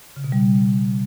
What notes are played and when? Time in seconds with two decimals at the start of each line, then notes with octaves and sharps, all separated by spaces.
0.16 C#3
0.24 B2
0.32 G3